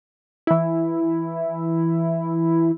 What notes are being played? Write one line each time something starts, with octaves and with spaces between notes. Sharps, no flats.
E3 E4